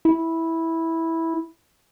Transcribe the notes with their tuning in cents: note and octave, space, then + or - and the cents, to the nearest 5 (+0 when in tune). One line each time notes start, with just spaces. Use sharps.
E4 -10